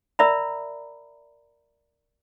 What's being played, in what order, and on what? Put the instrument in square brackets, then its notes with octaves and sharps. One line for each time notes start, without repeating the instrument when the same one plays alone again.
[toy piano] A#4 D5 E5 A#5 B5